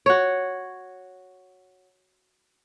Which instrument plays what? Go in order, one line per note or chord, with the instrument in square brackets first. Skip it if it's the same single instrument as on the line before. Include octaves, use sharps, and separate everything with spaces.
[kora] F#4 C#5